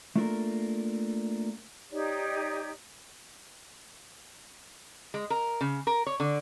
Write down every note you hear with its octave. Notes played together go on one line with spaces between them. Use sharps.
A3 A#3 D4 F4 A4 A#4
D#4 G4 C#5 D5
G#3
A#4
C#3
A#4
C#5
D3